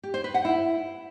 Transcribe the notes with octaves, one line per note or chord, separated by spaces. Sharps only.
G4
C5
B4
F#5
E4